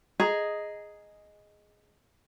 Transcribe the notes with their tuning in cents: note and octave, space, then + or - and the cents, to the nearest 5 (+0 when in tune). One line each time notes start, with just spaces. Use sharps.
G#4 +0 D#5 +0 A#5 +0